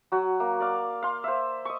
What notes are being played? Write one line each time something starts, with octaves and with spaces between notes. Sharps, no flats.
F#3 F#4
A#3
D5 F5
F5 C6
C5 E5
D#5 C#6